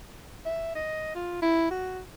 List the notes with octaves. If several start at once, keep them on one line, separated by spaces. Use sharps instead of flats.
E5
D#5
F4
E4
F#4